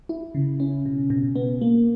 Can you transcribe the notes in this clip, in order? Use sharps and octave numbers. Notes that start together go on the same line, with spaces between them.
E4
C#3
C#4
B2
B2
B3
A#3